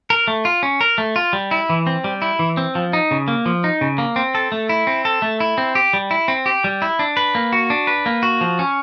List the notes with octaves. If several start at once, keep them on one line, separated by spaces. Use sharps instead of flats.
A#4
A3
F4
C#4
A#4
A3
F4
G3
E4
E3
C4
G3
E4
E3
C4
F3
D#4
C#3
A#3
F3
D#4
C#3
A#3
C4
A4
A3
E4
C4
A4
A3
E4
C4
G4
G3
E4
C4
G4
G3
E4
D4
B4
A#3
F#4
D4
B4
A#3
F#4
F3
C#4